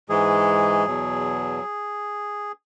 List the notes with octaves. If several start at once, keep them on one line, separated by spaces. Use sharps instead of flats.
G#2 E3 G#3 G#4
E2 B2 F#3